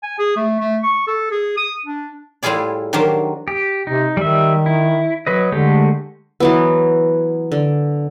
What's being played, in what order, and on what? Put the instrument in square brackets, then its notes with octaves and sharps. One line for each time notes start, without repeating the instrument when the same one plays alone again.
[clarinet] G#5
G#4
A3
A3
C#6
A4
G#4
D#6
D4
[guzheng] A2 G3 E4 F4 G#4 D5
D#3 F#3 D4 G4 A#4 C5
[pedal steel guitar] G4
[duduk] C3 [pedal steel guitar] D#4
[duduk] D#3 [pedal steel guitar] G3 E5
[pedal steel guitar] E4
F#3 B4 D#5
[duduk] D3 [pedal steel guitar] G#3 A3 G4
[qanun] E3 F#3 B3
D3